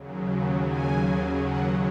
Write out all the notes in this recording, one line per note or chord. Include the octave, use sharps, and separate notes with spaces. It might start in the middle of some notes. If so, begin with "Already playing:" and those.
Already playing: D#2 C#3 F#3
G#5
F#5